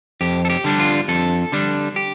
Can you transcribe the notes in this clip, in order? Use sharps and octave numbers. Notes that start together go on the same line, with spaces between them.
F2 G4
A4
G4
D3 G3 D4
F4
F2 A4
D3 G3 D4
G4